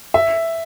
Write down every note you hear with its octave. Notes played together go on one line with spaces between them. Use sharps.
E5